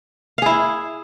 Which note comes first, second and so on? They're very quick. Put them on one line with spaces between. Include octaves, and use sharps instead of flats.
F5 G#4 E4